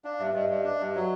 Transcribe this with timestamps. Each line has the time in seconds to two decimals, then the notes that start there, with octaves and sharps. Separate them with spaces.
0.05 D4 F5
0.20 G2 E5
0.34 G2 D#5
0.49 G2 D5
0.64 D4
0.80 G2
0.95 F#3